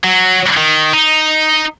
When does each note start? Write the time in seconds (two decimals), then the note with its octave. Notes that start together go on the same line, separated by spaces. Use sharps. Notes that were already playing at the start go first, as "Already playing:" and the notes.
0.04 F#3
0.57 D#3
0.93 D#4